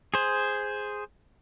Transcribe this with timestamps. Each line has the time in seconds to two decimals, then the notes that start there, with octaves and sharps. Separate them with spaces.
0.14 G#4 C5